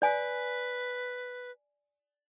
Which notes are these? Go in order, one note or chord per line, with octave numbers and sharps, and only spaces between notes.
B4 D5 G#5